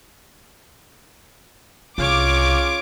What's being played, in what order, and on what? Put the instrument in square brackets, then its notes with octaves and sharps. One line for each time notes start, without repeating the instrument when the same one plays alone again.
[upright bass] C2 [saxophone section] C#3 F4 [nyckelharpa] C#5 [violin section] D6